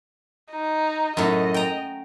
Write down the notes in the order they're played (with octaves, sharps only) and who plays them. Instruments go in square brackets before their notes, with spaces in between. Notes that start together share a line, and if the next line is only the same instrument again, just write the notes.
[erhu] D#4
[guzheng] F#2 A2 [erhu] D#5
[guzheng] G5 A#5